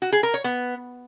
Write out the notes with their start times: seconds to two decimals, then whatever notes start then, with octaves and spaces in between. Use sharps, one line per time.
0.02 F#4
0.12 G#4
0.23 A#4
0.34 C#5
0.44 B3